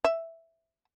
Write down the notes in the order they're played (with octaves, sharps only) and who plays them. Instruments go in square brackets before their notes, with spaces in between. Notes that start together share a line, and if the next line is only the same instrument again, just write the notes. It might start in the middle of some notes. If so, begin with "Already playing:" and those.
[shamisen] E5